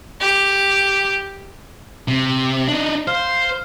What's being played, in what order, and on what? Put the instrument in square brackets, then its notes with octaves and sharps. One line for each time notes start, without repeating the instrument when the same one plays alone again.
[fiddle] G4
[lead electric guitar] C3
D4 D#4
[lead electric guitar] C5 [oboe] F5